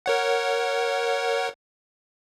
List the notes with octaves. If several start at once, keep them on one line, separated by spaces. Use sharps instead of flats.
A#4 C#5 F#5